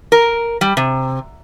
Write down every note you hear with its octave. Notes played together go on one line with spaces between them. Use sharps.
A#4
G3
C3